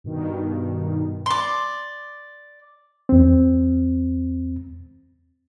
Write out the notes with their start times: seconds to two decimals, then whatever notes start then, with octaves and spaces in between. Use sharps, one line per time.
0.04 G2 B2 D#3
1.26 D5 C6
3.09 E2 C4